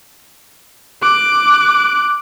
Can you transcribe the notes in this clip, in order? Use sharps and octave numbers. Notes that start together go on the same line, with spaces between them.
D6 F#6